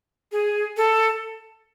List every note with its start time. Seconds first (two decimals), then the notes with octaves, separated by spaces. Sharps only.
0.32 G#4
0.77 A4